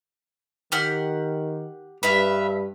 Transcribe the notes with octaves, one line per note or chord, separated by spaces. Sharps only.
D#3 G4 F#5 F6
G2 B4 E5 F5